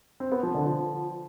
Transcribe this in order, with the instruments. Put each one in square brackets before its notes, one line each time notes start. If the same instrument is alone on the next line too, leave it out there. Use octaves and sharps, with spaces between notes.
[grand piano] C4
B3
F3
D3
F3